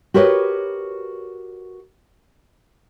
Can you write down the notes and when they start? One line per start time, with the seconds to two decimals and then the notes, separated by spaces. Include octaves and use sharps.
0.14 F#4 G4 A#4 B4 C#5 D#5